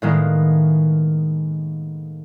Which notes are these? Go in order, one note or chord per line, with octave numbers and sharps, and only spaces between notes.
A2 D#3 G#3 A#3 B3